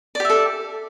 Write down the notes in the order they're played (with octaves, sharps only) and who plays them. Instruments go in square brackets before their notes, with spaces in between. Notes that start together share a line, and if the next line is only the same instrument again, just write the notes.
[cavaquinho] D5
G4
E5
A4